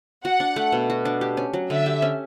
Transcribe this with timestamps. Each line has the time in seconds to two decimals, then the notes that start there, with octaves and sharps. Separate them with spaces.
0.25 F#4 F#5
0.40 D4
0.56 A3
0.72 B2
0.90 F#4
1.05 D4
1.21 G4
1.37 C#4
1.53 F#3
1.70 D3 E5
1.86 G4
2.02 C#4